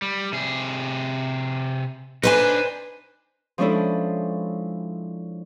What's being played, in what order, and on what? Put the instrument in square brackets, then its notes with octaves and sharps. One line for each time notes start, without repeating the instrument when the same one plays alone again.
[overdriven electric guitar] G3
C3 G#4
[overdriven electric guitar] D4 D#4 [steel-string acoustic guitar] B4 C5 G#5
[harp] F3 G#3 C#4 D4 E4 A4